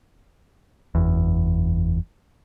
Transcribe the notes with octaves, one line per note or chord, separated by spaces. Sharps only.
F#1 E2